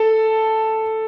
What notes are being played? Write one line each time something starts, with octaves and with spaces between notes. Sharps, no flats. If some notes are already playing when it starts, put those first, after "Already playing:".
Already playing: A4